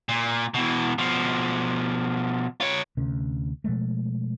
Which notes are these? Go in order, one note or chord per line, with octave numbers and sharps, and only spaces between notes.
A#2
B2 E3
B2 F3
F4 C#5
D2 C3 C#4
B2 F3 G#3 A3